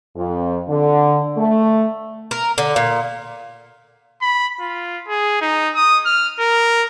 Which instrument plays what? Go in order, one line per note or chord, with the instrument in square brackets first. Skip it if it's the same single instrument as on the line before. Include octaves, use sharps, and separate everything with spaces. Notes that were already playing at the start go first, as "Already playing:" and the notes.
[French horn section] F2
D3
A3
[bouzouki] A#4
D3
A#2
[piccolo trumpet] B5
F4
G#4
D#4
D#6
F6
A#4